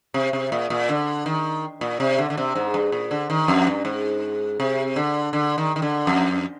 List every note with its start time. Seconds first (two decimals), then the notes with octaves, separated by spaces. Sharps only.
0.14 C3
0.33 C3
0.52 A#2
0.70 A#2
0.89 D3
1.26 D#3
1.81 A#2
2.00 C3
2.18 D3
2.30 D3
2.37 C3
2.55 G#2
2.74 G2
2.92 A#2
3.11 D3
3.30 D#3
3.48 F2
3.67 G2
3.85 G#2
4.60 C3
4.96 D3
5.33 D3
5.58 D#3
5.76 D#3
5.82 D3
6.07 F2